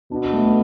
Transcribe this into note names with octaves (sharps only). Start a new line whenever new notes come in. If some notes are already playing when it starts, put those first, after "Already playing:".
B2 D4
A3